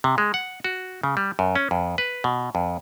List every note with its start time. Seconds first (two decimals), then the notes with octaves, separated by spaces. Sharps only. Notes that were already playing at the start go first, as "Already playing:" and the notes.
0.04 C3
0.18 G#3
0.34 F#5
0.64 F#4
1.03 C#3
1.17 G3
1.39 F#2
1.56 C#4
1.71 F2
1.98 B4
2.24 B2
2.55 F2